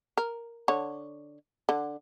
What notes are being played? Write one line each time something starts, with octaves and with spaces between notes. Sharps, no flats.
A#4
D3 C#5
D3